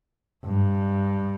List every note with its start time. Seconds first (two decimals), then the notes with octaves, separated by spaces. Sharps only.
0.46 G2